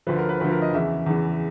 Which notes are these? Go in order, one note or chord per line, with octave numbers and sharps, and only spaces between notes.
D2 D3 F3 B4
A#4
B4
D2 D3 F3 B4
A#4
D#5
E2 C#3 E3 E5
E2 C#3 E3